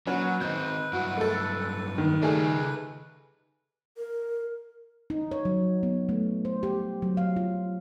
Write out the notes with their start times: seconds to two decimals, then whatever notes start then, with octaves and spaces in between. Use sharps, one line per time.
0.07 A#2 F#3 C#4 F#4 B4
0.41 D#3 C4 D#4 G6
0.93 G2 F#3 E4 F#4
1.17 A3 A4
1.98 D#3
2.22 C#3 G3 A3 G#4 D#5 A5
3.98 A#4
5.10 D#4
5.31 C#5
5.45 F#3
5.83 B3
6.09 A3
6.45 C5
6.63 G4
7.02 F#3
7.17 F5
7.36 F4